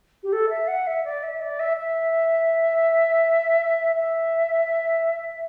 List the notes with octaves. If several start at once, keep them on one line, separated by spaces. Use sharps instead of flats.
G4
A4
E5
F#5
E5
D5
E5
D5
E5
E5
E5